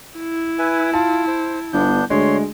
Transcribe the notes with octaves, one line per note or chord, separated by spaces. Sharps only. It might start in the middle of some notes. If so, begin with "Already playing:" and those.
E4
B4 E5 G#5
F4 A5
C5
G1 B3 D4 G6
D2 G#3 C#5 C6